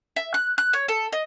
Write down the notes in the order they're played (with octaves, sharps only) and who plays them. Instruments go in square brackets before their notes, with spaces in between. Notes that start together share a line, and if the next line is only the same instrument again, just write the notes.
[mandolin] E5
F#6
F#6
C#5
A4
D#5